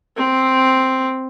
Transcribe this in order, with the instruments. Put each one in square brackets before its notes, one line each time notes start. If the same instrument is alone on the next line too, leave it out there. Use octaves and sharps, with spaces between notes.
[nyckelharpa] C4